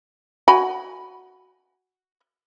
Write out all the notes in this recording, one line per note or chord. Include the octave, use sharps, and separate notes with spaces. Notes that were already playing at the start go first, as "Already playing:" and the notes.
F#4 G#5 B5